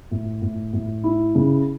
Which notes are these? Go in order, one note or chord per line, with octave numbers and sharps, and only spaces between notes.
A2
A2
A2
E4
C#3